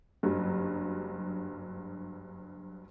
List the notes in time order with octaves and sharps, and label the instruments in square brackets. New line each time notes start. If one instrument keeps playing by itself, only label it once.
[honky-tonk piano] F#1 G2 F#3